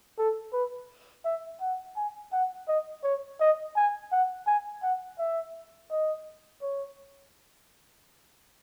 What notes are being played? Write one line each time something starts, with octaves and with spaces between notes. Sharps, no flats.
A4
B4
E5
F#5
G#5
F#5
D#5
C#5
D#5
G#5
F#5
G#5
F#5
E5
D#5
C#5